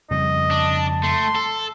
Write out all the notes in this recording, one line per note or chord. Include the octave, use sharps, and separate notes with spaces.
F2 C#3 G3 D#5
D4 A5
A3 C6
A4